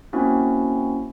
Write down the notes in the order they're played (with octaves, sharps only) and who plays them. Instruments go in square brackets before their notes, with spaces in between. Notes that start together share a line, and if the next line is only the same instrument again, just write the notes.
[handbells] A#3 C4 C#4 E4 F#4